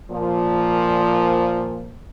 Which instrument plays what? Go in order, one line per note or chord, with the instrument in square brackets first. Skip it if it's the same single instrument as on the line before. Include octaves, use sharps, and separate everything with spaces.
[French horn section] A#2 F3